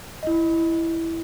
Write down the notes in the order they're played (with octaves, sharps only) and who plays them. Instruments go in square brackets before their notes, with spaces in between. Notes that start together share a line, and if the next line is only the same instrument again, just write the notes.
[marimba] E4 D#5